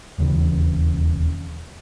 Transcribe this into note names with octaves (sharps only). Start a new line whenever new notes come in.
E1 D#2 C#3 E3